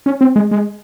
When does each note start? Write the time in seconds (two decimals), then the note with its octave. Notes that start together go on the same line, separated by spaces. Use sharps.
0.06 C#4
0.21 C4
0.36 G#3
0.51 G#3